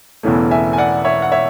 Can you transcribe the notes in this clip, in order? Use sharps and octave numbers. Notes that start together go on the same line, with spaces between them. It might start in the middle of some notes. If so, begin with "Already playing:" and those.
E1 E2 C#3 E3 A3
E5 G#5
G#5
D5 F#5
C#5 E5
F#5
C#5 E5